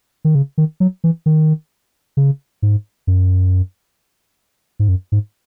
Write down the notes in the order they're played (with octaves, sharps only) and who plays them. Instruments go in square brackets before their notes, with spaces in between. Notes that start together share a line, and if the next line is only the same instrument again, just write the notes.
[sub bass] D#3
C#3
D#3
F#3
E3
D#3
C#3
G#2
F#2
G#2
F#2
G#2